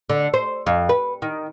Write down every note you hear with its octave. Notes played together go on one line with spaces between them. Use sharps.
D3
C5
F2
B4
D#3